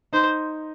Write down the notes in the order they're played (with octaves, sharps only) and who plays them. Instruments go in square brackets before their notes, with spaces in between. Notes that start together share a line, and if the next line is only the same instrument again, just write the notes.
[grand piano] D#4 [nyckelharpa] C5